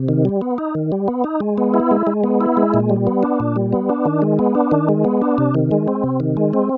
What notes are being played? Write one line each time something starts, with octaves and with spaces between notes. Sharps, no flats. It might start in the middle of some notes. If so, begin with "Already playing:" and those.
Already playing: C3
D#3
G3
B3
D#4
D#3
G3
B3
D#4
G#3
B3
E4
G#3
G#3
B3
E4
G#3
A#2
G3
B3
D4
A#2
G3
B3
D4
D#3
G#3
B3
D4
D#3
G#3
B3
D4
C3
D#3
G#3
C4
C3
D#3
G#3
C4